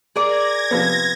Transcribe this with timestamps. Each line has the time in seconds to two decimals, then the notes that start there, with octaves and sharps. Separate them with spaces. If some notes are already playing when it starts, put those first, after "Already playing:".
0.16 G#4 A#4 D5 G#6 A#6
0.71 C3 F3 B3